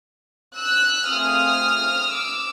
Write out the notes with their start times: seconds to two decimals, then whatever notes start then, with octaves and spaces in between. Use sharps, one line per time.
0.57 E6 F#6
1.08 A3 C4 F4 G#4 D#6 F6
2.12 D6 E6